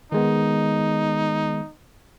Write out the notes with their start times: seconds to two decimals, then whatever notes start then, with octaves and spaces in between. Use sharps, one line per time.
0.12 D#3 G#3 B3 D#4